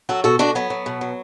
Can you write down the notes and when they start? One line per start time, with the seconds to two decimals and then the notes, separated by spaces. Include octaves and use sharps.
0.09 F#3 F#4 A4
0.24 B2 F#4 A4
0.39 B2 D4 F#4
0.55 F#3 B3
0.70 F#3
0.86 B2
1.01 F#3